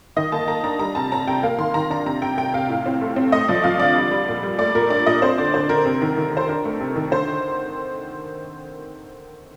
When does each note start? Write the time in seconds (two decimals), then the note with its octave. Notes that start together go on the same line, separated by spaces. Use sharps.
0.16 D#3 D#5
0.32 A#3 A5
0.48 A#3 A#5
0.64 D4 A#5
0.79 G3 A#5
0.95 C3 A5
1.12 C4 A#5
1.27 C3 G5
1.43 A#3 F5
1.58 D#3 C6
1.74 D#3 A#5
1.90 D4 A#5
2.06 C3 A#5
2.22 C3 G5
2.37 C3 G5
2.53 C3 F5
2.69 A2
2.86 C4
3.01 A3
3.16 C4
3.32 A3 D#5
3.48 F3 D5
3.64 F3 F5
3.80 D3 D5
3.95 G3
4.11 G3
4.28 A#2
4.43 G3
4.58 A3 D5
4.75 A#2 A#4
4.90 D4 D5
5.06 A#2 D#5
5.22 C4 C5
5.38 D3 D5
5.54 D3 C5
5.69 D3 A#4
5.85 C3
6.01 D#3
6.17 D#3
6.33 D#3 C5
6.49 D4 A#4
6.65 A3
6.80 C3
6.96 D#3
7.11 D3 C5